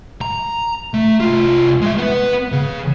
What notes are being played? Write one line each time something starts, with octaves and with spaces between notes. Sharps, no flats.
A#5
A3
C2 F4
G#3 E5
B3 B4
C#3